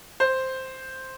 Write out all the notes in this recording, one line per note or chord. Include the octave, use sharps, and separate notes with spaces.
C5